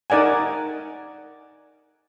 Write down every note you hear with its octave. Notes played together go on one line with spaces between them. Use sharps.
D#4 A#4 D5 F#5 G#5